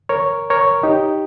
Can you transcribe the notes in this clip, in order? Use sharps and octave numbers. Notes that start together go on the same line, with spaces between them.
A#4 C#5
A#4 C#5
D#4 G4